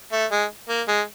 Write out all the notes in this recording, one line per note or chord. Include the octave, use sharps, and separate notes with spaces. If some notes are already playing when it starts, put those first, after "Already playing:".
A3
G#3
A#3
G#3